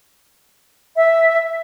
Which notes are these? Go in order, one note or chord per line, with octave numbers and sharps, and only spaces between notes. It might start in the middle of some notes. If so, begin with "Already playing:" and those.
E5